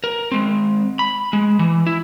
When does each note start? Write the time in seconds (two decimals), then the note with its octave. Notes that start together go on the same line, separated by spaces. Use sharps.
0.04 A#4
0.32 G#3 C4
0.99 B5
1.33 G#3
1.59 E3
1.86 E4